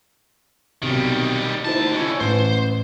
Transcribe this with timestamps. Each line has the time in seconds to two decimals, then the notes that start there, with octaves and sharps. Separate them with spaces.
0.82 B1 C3 D#3 G3
1.65 D2 D#4 E4 C5 A5
1.92 D3 C#4 E4
2.20 A1 B4 C5